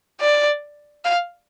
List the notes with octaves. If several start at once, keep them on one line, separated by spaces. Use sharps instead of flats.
D5
F5